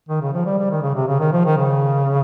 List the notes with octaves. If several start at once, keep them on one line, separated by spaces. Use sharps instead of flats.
D#3
C#3
F3
G3
G3
D#3
C#3
C3
C#3
D#3
F3
D#3
C#3